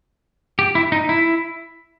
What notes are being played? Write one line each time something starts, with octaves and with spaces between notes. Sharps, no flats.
G4
E4
D#4
E4